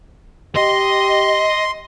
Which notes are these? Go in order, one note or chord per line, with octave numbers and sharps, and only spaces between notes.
G4 D#5 C6